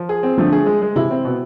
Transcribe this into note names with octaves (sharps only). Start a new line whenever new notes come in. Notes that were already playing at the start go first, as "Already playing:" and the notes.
Already playing: F3
G#4
C4
D3 F3 A3
G#4
G#3
G#3
C3 E3 E4
C4
B2